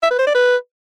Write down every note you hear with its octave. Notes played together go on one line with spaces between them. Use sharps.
E5
B4
C5
D5
B4